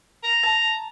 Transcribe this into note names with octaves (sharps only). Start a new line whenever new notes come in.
A#5
A5